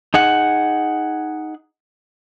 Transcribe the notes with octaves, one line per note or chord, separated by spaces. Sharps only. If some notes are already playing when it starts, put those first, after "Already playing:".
D#4 G#4 F#5